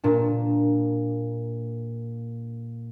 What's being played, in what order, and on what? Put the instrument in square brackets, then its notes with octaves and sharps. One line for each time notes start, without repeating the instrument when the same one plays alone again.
[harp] A#2 D4